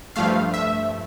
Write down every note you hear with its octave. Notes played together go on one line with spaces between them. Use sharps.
G2 F3 A3 F5
E5